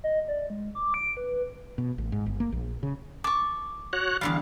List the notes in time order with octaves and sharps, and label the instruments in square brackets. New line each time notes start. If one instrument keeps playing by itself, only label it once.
[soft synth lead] D#5
D5
G#3
D6
D7
B4
[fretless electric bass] B2
A1
G#2
G1
A#3
A#1
C#3
[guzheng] A5 [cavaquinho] C#6 D6
[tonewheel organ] F#4 C#5 F#6
[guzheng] E2 D3 G3 [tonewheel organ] F5